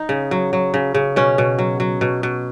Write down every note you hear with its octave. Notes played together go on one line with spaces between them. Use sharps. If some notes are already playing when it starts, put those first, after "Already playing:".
Already playing: D#4
C#3
F#3
F#3
C#3
C#3
B2 C#4
B2
F#3
F#3
B2
B2